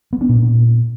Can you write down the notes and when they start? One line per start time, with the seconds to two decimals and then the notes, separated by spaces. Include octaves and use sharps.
0.13 B3
0.21 D4
0.29 A#2